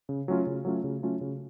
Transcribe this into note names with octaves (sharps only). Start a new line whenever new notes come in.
C#3
F#3 A3 C#4 F4
C#3
F#3 A3 C#4 F4
C#3
F#3 A3 C#4 F4
C#3